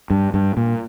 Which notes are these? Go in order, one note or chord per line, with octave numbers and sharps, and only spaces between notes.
G2
G2
A#2